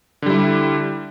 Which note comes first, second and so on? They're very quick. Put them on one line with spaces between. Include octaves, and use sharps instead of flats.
D3 G3 E4